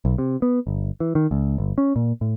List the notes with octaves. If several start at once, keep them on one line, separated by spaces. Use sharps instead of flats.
B1
C3
B3
G1
E3
D#3
C#2
G1
C#4
A#2
A2